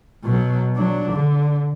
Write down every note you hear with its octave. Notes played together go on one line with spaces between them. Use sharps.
B2 F#3
F#3 D4
D3